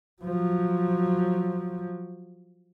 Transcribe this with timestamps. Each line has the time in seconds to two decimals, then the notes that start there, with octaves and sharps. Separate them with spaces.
0.22 F3 F#3